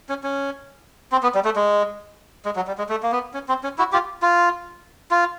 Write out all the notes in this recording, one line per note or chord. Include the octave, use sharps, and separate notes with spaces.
C#4
C#4
C4
B3
G3
A3
G#3
G#3
F#3
G3
G#3
A3
A#3
B3
C#4
C4
C#4
E4 F#4
F4 G4
F4
F4